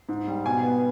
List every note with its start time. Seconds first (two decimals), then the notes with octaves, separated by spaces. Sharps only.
0.09 G#2
0.28 G3
0.45 B2 G#5
0.63 B3